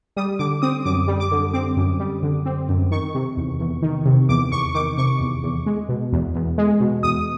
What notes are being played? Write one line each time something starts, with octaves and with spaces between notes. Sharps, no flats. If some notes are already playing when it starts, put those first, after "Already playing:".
G3 D#6
D3 D6
C4 D#6
F#2 D6
G3
D6
D3
C4 D6
F#2
G3
D3
C4
F#2
D#3 C#6
C3
E2
E2
D#3
C3
E2 D6
E2 C#6
D#3 D6
C3 C#6
E2
E2
G#3
B2
E2
E2
G#3
B2
E2 D#6